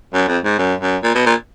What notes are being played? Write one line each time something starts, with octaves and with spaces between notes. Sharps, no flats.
F#2
F2
G#2
F#2
F#2
A#2
B2
A#2